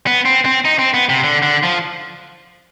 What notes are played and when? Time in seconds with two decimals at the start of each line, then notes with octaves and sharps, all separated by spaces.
0.07 B3
0.25 C4
0.45 C4
0.65 D#4
0.79 C4
0.94 B3
1.09 C3
1.24 D3
1.43 D3
1.63 F3